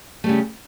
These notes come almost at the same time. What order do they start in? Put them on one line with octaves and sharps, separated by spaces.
A3 G3 C#3